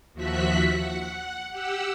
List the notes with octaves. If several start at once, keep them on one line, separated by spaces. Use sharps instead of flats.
D#2 F3 F#4 E5 F#6 B6
F#5
G4 F#5 E6